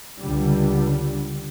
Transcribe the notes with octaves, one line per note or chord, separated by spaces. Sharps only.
C#2 D3 G3